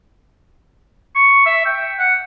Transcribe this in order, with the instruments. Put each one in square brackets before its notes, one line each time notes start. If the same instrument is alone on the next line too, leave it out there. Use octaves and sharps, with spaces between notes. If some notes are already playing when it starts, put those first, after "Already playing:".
[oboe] C#6
E5
G5
F#5